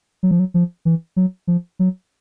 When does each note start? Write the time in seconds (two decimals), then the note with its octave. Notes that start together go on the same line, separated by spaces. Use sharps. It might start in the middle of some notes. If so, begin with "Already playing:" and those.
0.23 F#3
0.31 F3
0.39 F#3
0.54 F3
0.85 E3
1.16 F#3
1.47 F3
1.79 F#3